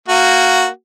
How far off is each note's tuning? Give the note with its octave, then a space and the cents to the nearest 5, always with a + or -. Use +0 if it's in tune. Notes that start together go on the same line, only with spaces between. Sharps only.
A#3 -10 F#4 +0